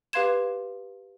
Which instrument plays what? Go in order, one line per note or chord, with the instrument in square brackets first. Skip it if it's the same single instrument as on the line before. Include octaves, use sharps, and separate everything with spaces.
[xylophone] G4 B4 F5 C6 G#6 E7